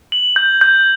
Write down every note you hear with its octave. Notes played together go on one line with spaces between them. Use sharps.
F#7
G6
G6